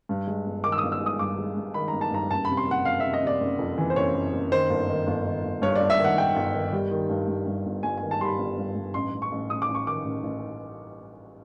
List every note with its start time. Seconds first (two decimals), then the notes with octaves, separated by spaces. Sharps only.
0.09 G2
0.27 G#3
0.46 G1
0.64 D#3 D6
0.72 E6
0.78 G1 D#6
0.92 E6
1.01 G#3
1.06 D#6
1.19 G2 D6
1.38 G#3
1.57 G2
1.74 D#3 B5
1.88 A#5
1.93 G1
2.01 A5
2.12 G2 A#5
2.30 F#1 A5
2.45 C3 B5
2.57 C6
2.67 F#1 F#5
2.85 F#1 F5
3.00 C3 E5
3.14 D#5
3.23 C3 D5
3.40 F#1
3.59 F2
3.78 E3
3.90 C5
3.96 F#1 C#5
4.14 F#1
4.33 F#1
4.52 D#3 C5
4.70 G1
4.89 D#3
5.07 G1
5.26 D#3
5.43 G1
5.62 G2 C#5
5.75 G1 D5
5.90 E5
6.00 D#3 F#5
6.17 D#3 G5
6.36 G1
6.55 D#3
6.72 G3
6.91 D#3
7.09 G2
7.28 G2
7.46 G2
7.66 G1
7.83 G1 G#5
7.98 D#3 G#5
8.11 A5
8.20 G3 C6
8.25 B5
8.38 G1
8.58 G2
8.76 G2
8.94 A1 C6
9.12 A1
9.22 C#6
9.31 A1
9.50 A1 D#6
9.62 D6
9.68 A1
9.75 C#6
9.86 D#3 D6
10.04 A1
10.23 A1